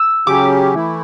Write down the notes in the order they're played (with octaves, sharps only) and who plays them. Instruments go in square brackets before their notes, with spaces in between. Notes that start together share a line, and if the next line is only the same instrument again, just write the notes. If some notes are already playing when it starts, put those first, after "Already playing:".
Already playing: [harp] E6
[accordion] C#3 F#3 C#4 G4 [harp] D6
[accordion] E3 A3 E4